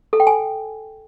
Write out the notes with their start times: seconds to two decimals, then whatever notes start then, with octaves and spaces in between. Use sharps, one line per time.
0.13 A4
0.20 G5
0.27 G#5